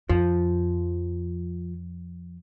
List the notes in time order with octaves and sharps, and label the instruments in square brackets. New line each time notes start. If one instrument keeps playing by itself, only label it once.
[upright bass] F2 [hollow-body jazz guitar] F3